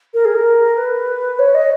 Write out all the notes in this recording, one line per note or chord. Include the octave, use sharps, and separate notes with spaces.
A#4
G#4
A#4
B4
C#5
D#5